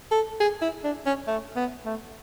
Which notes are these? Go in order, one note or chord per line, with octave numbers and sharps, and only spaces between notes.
A4
G#4
E4
D4
C#4
A3
B3
A3